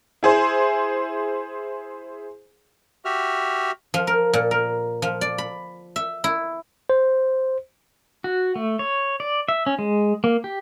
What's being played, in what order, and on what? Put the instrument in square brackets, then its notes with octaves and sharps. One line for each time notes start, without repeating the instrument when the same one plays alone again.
[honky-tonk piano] E4 G#4 C5
[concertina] F#4 G4 E5 F6
[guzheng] F3
A#4
A#2
A#4
F3
D5
B5
E5
E4
[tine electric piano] C5
[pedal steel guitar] F#4
A3
C#5
D5
E5
C#4
G#3
A#3
G4